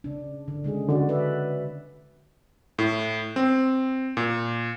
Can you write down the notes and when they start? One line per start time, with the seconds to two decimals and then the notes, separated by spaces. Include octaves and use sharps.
0.04 C#3 D4
0.48 D3
0.64 C#3 G#3 G#4
0.89 D3 C#4 F#4 D5
1.09 B4 D5 E5
2.79 A2
3.36 C4
4.17 A#2